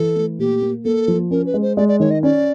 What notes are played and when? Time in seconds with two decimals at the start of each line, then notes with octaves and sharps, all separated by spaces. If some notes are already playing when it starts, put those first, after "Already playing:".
Already playing: E3 A4
0.16 A3
0.39 A#2 G4
0.62 A#3
0.85 A#3 A4
1.08 F3
1.31 C#4 A#4
1.46 B4
1.54 G#3
1.62 C5
1.77 G#3 D5
1.88 D5
2.00 D#3 C#5
2.11 D#5
2.23 C#4 D5